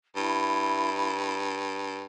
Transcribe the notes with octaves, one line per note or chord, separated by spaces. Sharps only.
G2 E4